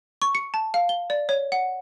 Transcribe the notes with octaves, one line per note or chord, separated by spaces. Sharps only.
C#6
C#7
A5
F5
G7
D5
C#5
F#5